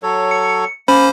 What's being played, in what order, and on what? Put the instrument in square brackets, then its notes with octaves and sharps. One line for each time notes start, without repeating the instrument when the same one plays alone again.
[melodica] F#3 A4 C#5
[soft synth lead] C#7
[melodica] A#3 [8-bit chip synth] C#4 C5 [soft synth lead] B5